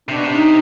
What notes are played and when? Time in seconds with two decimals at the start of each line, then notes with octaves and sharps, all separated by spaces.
0.09 C3 D4
0.16 B2
0.24 C3
0.33 D#4